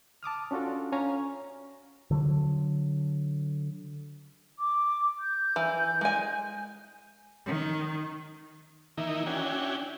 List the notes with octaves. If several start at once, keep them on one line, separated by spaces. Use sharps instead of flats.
A5 D6 D#6 F6
C#4 D4 F4 F#4 A4
C#4 C#5 F5 G#5 A#5
D3 F#3
D6
G6
E3
G#3 G#5
D#3
D#3 E3 A#3 D#4 E4
C#4 D4 E4 F#4 G5 G#5